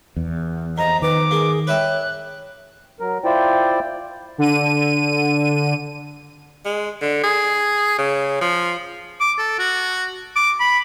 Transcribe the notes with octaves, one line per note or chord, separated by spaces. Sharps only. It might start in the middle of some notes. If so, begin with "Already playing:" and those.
E2
F2 D#5 A#5
D#3 B4 D6
A#3 G#4
B4 C#5 E5 G5 F#6
F#3 A#4
E4 F4 C5 D5 G5
D3 D#7
G#3
D3
G#4
C#3
F3
D6
A4
F#4
D6
B5